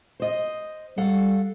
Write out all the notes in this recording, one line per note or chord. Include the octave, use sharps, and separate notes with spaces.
C5 D#5
G3 A4 F5 F#5